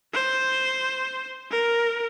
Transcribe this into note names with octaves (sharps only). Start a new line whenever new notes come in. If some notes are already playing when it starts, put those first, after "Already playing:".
C5
A#4